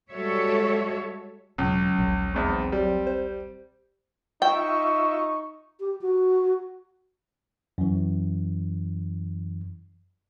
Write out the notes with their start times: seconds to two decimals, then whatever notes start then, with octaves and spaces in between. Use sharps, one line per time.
0.11 G3 G#3 F#4 A4 C#5 E5
1.58 E1 C#2 G#2 C#3 F#3
1.99 D#1 A#1
2.35 E2 G#2 C4
2.72 G3
3.07 C5
4.42 D#4 F4 E5 G5 C#6
5.80 G4
6.01 F#4
7.78 F#2 E3